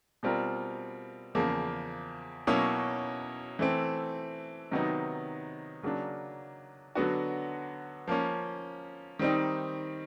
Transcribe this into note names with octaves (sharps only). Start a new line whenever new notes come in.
B2 G3 C4 F4 A#4
E2 C#3 F3 A#3
B2 F#3 A#3 C#4 E4
E3 A3 C4
C3 D#3 F#3 B3 D#4
C#3 F#3 A#3 D4
D3 F#3 B3 D4 F#4
F3 A#3 C#4
D#3 G3 C4 D#4